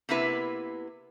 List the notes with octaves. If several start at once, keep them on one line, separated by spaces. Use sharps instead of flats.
C3 A#3 B3 E4 B4